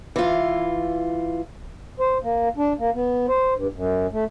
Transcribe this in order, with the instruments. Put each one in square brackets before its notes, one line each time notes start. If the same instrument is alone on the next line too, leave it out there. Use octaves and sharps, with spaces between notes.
[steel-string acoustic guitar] E3 F4
[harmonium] C5
A#3
D4
A#3
B3
C5
G2
F#2
A3